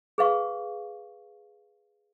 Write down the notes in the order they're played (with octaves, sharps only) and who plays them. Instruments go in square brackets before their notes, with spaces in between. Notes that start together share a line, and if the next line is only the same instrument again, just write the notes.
[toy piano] G#4 B4 F5 C#6